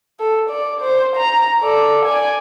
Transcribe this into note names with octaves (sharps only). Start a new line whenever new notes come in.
A4
D5
C5
A#5
A4 D5
D5 G#5